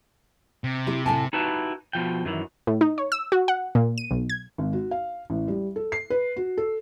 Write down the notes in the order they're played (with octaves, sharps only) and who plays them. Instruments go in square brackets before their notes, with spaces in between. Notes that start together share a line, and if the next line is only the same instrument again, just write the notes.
[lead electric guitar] C3
[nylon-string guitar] E4 G4
A2 G#5 A5
[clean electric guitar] D#4 E4 F#4 G4 B4 A5
B2 F3 G5
F#2 D#3 E3
[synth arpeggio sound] A2
D#4
C#5
E6
F#4
F#5
A#2
D#7
B1
G#6
[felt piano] G#1
F#4
F5
A1
G3
A4
C7
B4
F#4
A4